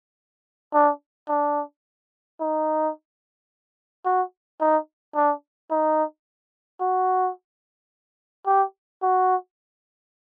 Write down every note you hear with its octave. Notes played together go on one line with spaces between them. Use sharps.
D4
D4
D#4
F#4
D#4
D4
D#4
F#4
G4
F#4